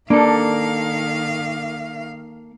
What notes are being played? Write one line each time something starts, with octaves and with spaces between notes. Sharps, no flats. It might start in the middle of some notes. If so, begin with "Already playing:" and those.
D#3 A#3 D4 A4 F5